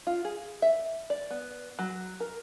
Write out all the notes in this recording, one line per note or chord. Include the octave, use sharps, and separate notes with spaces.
F4
G#4
E5
D5
B3
F#3
A#4